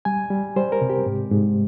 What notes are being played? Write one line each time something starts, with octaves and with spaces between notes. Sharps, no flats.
G3 G#5
G3
G3 C5
A#4
C3
G4
G#2
G#2